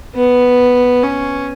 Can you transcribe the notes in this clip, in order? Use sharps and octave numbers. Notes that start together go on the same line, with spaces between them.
B3
C#4